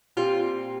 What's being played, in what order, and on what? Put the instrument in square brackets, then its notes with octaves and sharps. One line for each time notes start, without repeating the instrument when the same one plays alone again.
[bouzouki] A#2 G3 C4 F4